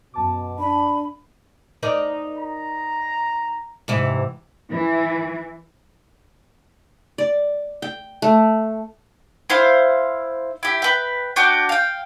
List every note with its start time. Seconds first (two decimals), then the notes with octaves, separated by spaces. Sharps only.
0.14 F#2 B2 A5 D6
0.59 D4 B5
1.83 D#4 A#4 D5
2.38 A#5
3.88 G#2 C3 E3
4.71 E3
7.18 D5
7.82 G5
8.22 A3
9.50 E4 C5 F5
10.63 E4 G4
10.82 B4 G5
11.36 D4 F#4 G5 D6
11.69 F5 G5